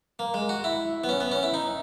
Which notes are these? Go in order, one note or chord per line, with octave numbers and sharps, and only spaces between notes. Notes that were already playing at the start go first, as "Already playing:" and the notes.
A#3
G#3
F#4
E4
B3
C#4
B3
C#4
E4
D#4